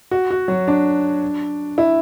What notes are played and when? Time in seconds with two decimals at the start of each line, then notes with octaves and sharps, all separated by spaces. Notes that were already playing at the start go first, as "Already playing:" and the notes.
0.11 F#4
0.31 F#4
0.48 F#3
0.68 D4
1.78 E4